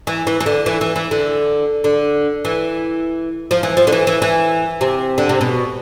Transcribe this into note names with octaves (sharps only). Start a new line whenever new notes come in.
E3
E3
E3
D3
E3
E3
E3
D3
D3
E3
F3
E3
F3
D3
E3
E3
E3
C3
D3
C3
B2